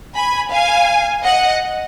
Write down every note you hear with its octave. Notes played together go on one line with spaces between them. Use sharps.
G#5 B5
F5 G#5
D#5 F#5